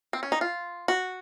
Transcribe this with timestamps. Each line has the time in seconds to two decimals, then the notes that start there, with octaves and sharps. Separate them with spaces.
0.13 C4
0.23 C#4
0.32 D#4
0.41 F4
0.88 F#4